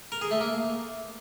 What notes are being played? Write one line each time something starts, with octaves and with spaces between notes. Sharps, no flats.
A#4
G#4
A3
A#3